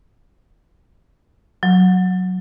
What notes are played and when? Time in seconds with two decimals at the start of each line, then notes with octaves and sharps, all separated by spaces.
1.63 F#3